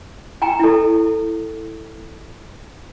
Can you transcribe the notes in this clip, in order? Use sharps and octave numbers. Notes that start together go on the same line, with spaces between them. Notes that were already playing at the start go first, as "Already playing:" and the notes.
G5 G#5 A#5
E4 A4